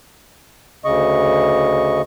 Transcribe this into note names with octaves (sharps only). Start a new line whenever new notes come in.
D2 C#3 D#5 C#6